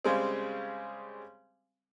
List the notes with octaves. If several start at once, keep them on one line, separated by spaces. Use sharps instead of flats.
C#3 G3 G#3 C4